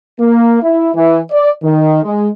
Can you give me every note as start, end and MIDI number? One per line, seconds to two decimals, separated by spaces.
0.20 0.62 58
0.63 0.91 64
0.95 1.20 52
1.31 1.50 74
1.63 2.01 51
2.03 2.28 56